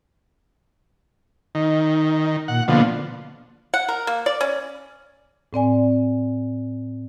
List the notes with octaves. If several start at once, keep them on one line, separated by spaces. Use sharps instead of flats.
D#3 D#4
A#2 F#5
B2 D3 F3 A#3
F#5
A#4
A#3
D5
C#4
A2 C4 D5 G#5